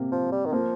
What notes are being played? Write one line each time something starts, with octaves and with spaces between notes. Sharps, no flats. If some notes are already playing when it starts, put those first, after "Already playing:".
Already playing: C3 A#3 C4
F3
G3
D#3
F3 A#3